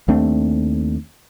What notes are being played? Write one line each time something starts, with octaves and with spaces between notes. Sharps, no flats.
D#2 A3 C4 D4